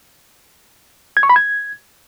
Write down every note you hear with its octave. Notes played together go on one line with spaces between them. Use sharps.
G#6
C#6
B5
G#6